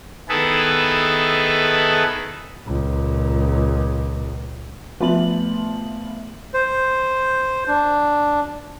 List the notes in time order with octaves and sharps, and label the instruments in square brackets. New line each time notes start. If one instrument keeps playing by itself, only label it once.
[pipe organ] D#3 B3 E4 G#4 A4 B4
[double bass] C#2 A#2
[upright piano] F3 B3 [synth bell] A3 E5 F#7
[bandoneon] C5
D4